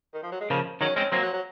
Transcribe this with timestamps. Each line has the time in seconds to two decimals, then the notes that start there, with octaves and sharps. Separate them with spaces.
0.14 D#3
0.23 F3
0.32 F#3
0.41 G#3
0.50 C#3 F3 A#3
0.81 D#3 F#3 C#4
0.96 G#3 C4 C#4
1.12 F#3 A#3 C4
1.22 F#3
1.33 F#3